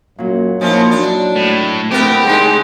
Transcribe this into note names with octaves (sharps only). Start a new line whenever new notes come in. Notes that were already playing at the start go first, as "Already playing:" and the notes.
F#2 A#2 F#3
F3 F#3 A#3 C#4 D#4 E4
F#3 D4
A2
A3 B3 C4 E4 G4 A#4
C#3 G#3 D#4 G#4